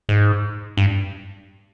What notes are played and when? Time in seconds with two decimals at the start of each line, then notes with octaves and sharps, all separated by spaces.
0.09 G#2
0.77 G2